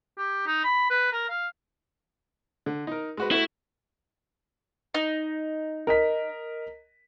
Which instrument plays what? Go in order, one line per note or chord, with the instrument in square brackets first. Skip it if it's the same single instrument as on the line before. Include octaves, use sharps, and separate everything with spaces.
[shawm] G4
D#4
B5
B4
A#4
F5
[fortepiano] D3
D#4 A#4
G#3 F#4 B4
[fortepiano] A3 F#4 [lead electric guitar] E4
[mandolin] D#4
[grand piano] A#4 D#5 B6